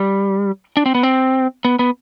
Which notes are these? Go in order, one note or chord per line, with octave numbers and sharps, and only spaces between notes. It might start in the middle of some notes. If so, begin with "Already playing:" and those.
Already playing: G3
D4
C4
B3
C4
B3
B3